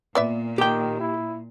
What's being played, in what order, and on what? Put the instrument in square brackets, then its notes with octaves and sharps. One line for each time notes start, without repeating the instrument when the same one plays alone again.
[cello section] A#2 [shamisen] B3 D5 E5
[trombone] D#3 [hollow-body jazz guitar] G4 G5
[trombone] E4